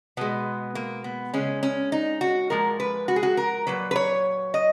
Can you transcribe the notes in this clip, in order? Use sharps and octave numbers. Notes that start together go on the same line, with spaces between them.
B2 G#3 B3
A#3
B3
C#3 G#3 C#4
C#4
D#4
F#4
A#2 F3 G#3 A#4
B4
F#4
G#4
F#4
A#4
A#2 F#3 B4
B4
C#5
D#5